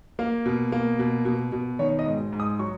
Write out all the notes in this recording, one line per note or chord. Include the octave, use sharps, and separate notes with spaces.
A#3 F5
B2
A#3
B2
B2
B2
D#3 C#5
D#5
G#2
G#2
D#6
F#3 C#6